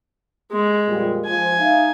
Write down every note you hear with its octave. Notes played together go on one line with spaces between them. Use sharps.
G#3
F2 A#2 G3
F3 G#5
D#4 E5 F5